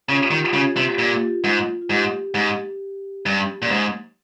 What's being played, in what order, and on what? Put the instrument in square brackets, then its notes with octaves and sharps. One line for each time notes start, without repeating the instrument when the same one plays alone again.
[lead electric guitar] C#3 [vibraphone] F4
[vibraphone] G4
F4
[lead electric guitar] D#3
[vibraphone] G4
F4
G4
[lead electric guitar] C#3
[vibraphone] F4
G4
[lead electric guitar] C3 [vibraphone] F4
[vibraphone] G4
F4
[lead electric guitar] A#2 [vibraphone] G4
[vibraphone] F4
G4
F4
[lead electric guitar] G#2
[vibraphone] F4
[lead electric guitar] G#2 [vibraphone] G4
[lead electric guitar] G#2
G2
A#2
G#2